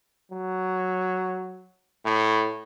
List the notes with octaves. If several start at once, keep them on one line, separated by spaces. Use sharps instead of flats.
F#3
A2